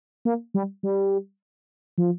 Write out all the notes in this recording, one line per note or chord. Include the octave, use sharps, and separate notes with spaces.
A#3
G3
G3
F3